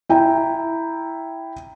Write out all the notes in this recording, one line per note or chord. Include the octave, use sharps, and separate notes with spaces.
E4 G5 A#5